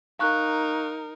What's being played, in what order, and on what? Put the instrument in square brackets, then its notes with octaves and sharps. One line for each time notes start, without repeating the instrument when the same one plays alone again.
[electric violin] D#4 A#4 [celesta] F5 C#6 F#6